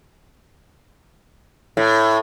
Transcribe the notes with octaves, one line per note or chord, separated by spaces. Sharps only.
A2